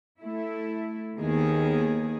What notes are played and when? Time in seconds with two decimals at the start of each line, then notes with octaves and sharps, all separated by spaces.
0.21 A3 E4
1.19 D#2 D#3 B3 G#4